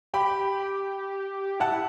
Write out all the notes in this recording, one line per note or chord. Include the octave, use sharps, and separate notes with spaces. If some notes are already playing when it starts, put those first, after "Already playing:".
G4 G5 B5
E4 F#5 A5